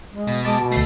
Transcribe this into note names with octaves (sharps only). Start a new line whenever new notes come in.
G#3
B2
G#3 A5 D6
B2
D2 A3 C7